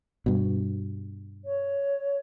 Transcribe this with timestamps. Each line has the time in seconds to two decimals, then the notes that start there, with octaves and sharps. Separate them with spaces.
0.26 G2 B2
1.45 C#5